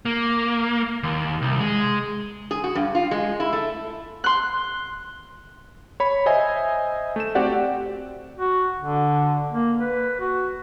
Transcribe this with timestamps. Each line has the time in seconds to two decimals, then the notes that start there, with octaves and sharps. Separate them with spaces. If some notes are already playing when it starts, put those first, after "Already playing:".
0.05 A#3
1.03 D#2
1.42 C2
1.60 G#3
2.51 G#4
2.64 F#4
2.75 G2
2.95 F4
3.11 G#3
3.40 E4
3.53 A3
4.24 C6 F#6
6.00 C#5 B5
6.26 C5 D#5 E5 G#5
7.16 A3 E7
7.35 C4 F#4 G4 D5 F#5
8.38 F#4
8.79 D3
9.51 A#3
9.78 B4
10.20 F#4